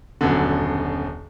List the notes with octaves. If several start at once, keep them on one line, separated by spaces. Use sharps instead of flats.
D#1 F#2 B2 D3